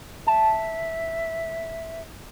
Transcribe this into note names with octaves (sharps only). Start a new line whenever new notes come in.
E5 A5